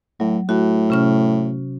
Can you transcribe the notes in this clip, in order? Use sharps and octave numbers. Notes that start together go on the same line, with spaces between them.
A2 F#3
A2 F#4
C3 C#4 F6